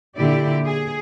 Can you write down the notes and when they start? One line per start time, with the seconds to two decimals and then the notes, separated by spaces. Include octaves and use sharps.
0.16 A#2 D3 E4 G4 D5
0.66 G#4